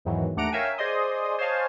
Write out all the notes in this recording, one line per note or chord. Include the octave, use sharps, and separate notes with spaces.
E2 G#2 D#3 E3 F#3
D#2 A3 D4 F#5 A#5 D7
A#4 C#5 E5 F5 G5 G#5
G#4 C5 D5 D#5 C6 D#6
C5 C#5 D#5 F5 G#5 A5